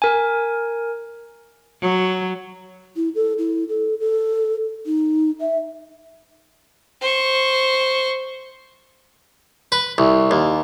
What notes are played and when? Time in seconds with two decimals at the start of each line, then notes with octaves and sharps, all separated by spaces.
0.02 A#4 G#5
1.82 F#3
2.96 E4
3.15 A4
3.38 E4
3.69 A4
4.00 A4
4.86 D#4
5.41 E5
7.02 C5 C#6
9.72 B4
9.98 C2
10.31 D#2